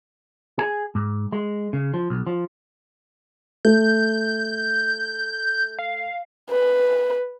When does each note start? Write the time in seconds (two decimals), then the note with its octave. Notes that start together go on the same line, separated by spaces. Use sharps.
0.59 G#4
0.95 G#2
1.32 G#3
1.73 C#3
1.94 F3
2.10 B1
2.27 F3
3.65 A3 G6
5.79 F5
6.51 B4